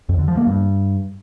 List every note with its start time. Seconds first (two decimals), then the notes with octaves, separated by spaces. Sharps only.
0.09 F2
0.19 D3
0.28 F3
0.37 A#3
0.47 G2